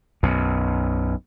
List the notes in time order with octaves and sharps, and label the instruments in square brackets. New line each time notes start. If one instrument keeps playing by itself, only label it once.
[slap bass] B1 F#2